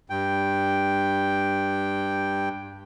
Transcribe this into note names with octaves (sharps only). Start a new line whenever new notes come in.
G2 G5